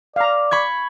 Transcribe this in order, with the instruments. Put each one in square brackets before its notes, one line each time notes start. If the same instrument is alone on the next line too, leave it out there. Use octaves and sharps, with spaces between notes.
[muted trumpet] D5 [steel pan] F5 A#5
[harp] B5 C#6 G#6